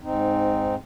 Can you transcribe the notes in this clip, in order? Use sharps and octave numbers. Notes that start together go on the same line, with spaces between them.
G#2 C4 D#4